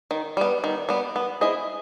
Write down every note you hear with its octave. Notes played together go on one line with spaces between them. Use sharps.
D#3
G3 B3
D#3
G3 B3
B3
E4 G#4 C5 D#5